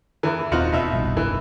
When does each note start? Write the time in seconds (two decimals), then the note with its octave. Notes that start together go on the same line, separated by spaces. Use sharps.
0.23 E2 E3
0.52 D#1 C4 D#4 F4 F#4
0.72 B2 D#4 E5
0.93 F1 B1 G2
1.17 E3